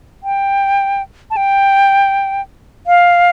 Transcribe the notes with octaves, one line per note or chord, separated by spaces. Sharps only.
G5
A5
G5
F5